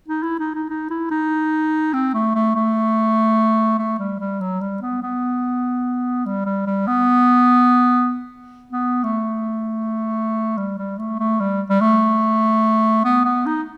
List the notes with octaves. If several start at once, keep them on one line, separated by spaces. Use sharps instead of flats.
D#4
E4
D#4
D#4
D#4
E4
D#4
C4
A3
A3
A3
A3
G3
G3
F#3
G3
B3
B3
G3
G3
G3
B3
B3
A3
G3
G3
A3
A3
G3
G3
A3
B3
B3
D#4